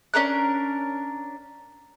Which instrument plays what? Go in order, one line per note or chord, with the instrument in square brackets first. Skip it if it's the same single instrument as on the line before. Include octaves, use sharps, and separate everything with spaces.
[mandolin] C#4 D4 A#4 F#6